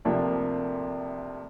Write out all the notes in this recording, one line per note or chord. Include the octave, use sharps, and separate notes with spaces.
D2 C3 F3 A#3 D4